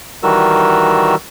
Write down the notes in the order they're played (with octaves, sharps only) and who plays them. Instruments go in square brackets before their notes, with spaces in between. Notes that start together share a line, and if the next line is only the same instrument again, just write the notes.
[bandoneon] D#3 E3 G3 F#4 A#4 E6